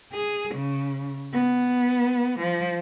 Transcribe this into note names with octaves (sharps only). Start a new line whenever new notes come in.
G#4
C#3
B3
F3